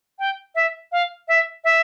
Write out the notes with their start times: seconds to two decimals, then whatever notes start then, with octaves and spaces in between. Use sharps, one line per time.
0.19 G5
0.55 E5
0.92 F5
1.28 E5
1.64 E5